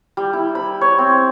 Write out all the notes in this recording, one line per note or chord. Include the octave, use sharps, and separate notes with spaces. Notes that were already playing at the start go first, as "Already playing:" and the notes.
G3
E4
B5
C#5
C4